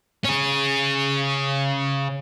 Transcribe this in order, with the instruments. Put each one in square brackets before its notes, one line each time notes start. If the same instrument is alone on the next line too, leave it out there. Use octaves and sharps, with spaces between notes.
[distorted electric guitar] C#4 G#4